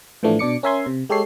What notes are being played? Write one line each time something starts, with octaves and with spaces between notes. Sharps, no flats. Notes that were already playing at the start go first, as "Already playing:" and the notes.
A2 E3 F3 A3 D4
B2 D4 D6 C#7
C#4 A#4 E5 G#5 C6 G#6
C3
G#3 G4 A4 C#5 C7